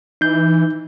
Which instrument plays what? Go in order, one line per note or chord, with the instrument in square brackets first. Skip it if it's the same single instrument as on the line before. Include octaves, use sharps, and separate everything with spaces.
[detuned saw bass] E3 [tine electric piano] D#4 G6